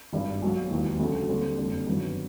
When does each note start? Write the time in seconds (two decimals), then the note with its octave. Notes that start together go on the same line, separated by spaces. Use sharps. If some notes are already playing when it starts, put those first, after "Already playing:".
0.13 G#1 G2 D#3 G3
0.42 B1 B2 F#3 A#3
0.70 E1 D#2 D#3 F#3
0.99 D2 C#3 F#3 A3 D4
1.29 D#2 D3 G3 C4
1.58 F#1 F2 D3 G3
1.87 G2 D#3 F#3 B3